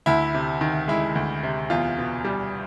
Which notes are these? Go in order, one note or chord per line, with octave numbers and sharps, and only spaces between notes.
D2 E4
C3
D#3
G#3 E4
D2
C3
E2 F4
B2
G3